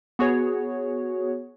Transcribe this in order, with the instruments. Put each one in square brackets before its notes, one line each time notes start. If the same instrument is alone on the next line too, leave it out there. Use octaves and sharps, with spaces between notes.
[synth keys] B3 F#4 G#4 C#5